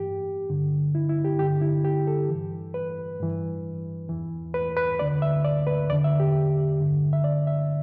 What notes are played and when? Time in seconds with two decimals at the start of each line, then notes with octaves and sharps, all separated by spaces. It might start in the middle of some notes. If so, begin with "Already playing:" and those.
Already playing: G2 E3 G4
0.49 G2 D3
0.95 E4
1.09 E4
1.25 G4
1.39 G2 D3 G4
1.62 E4
1.85 G4
2.07 A4
2.29 G2 E3
2.74 B4
3.20 G2 E3
4.09 E2 E3
4.54 B4
4.77 B4
4.99 D2 D3 D5
5.22 E5
5.45 D5
5.67 B4
5.89 E2 D5
5.93 D3
6.04 E5
6.20 G4
6.80 G2 D3
7.13 E5
7.24 D5
7.47 E5